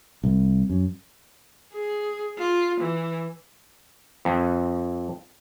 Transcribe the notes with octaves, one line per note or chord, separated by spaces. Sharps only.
C2
F#2
G#4
F4
E3
F2